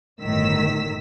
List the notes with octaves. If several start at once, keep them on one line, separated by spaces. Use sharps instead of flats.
G1 A2 D#3 E6 B6